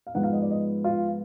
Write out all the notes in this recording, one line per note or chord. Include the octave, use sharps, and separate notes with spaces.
F5
G#2 F3 G#3 B3 F#5
F5
D#5
D5
D#5
F4